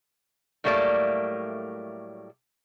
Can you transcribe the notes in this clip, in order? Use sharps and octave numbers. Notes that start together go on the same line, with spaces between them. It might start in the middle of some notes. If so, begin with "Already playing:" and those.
A2 F#3 G3 A3 A#3 D5